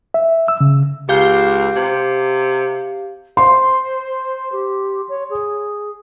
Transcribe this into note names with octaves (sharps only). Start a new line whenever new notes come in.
E5
E6
C#3
C#2 G4 F5 G6
C3
C5 C6
G4
C#5
G#4